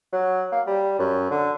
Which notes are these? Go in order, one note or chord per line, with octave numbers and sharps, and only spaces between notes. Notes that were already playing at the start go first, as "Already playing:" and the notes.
F#3
A#3
G3
F#2
D3